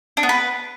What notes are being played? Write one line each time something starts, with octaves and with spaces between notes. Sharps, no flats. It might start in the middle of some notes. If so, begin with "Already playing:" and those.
D4
B3
B4